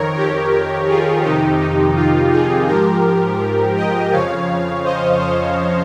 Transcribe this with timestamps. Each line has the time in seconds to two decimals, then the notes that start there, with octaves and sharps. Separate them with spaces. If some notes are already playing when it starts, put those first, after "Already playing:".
Already playing: F2 D#3 A#4 C#5
0.15 G4 A#4
0.88 F4 G#4
1.24 F2 C3 D#3 D#4 G4
1.60 D#4
1.96 F4
2.32 F4 G#4
2.68 G#2 F3 G4 A#4
3.76 D#5 G5
4.12 F2 C#3 F3 C#5 F5
4.84 C5 D#5
5.20 C5 D#5